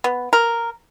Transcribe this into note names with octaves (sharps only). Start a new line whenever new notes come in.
B3
A#4